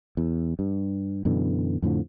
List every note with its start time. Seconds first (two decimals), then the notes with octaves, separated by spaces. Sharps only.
0.17 E2
0.59 G2
1.25 F#2 B2 D3 E3
1.82 F2 A2 D3 F3